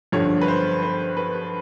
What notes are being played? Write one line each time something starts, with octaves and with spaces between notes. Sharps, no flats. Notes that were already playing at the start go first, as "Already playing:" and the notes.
G2 D3 F3 C#5
B4
C5
C5
B4